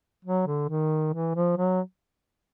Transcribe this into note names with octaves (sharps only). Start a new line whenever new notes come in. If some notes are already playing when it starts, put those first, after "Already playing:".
F#3
D3
D#3
E3
F3
F#3